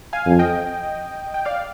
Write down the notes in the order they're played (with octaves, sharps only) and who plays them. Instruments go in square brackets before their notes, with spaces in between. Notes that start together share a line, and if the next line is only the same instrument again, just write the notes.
[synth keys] F5 G#5
[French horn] F2
[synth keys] D#5 G5
G5
D5 F5